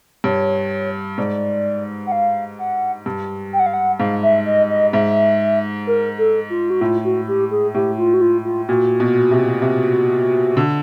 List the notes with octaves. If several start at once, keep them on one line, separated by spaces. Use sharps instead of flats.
G2 C#5
G#2 D5
F#5
F5
F#5
G2
G5
F#5
F5
F#5
G#2 F5
E5
D#5
D#5
G#2 E5
A#4
A4
F4
F#4
A2 F4
F#4
G4
G#4
A2 G4
F4
F#4
F4
F4
A#2 F#4
B2
C3
C3
D3